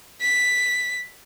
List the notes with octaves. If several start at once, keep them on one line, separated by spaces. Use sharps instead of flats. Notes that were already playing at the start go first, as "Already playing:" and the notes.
B6